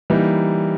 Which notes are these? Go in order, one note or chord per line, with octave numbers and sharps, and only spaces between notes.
E3 G3 A#3 D#4